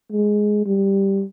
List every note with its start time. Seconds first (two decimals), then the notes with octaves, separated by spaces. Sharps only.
0.12 G#3
0.66 G3